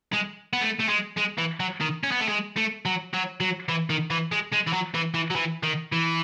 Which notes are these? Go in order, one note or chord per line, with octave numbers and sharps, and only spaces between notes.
G#3
B3
A3
A3
G#3
G#3
E3
F#3
D#3
C#4
B3
A3
G#3
A3
F#3
F#3
F#3
E3
D#3
E3
G#3
G#3
E3
F#3
E3
E3
F#3
E3
D#3
E3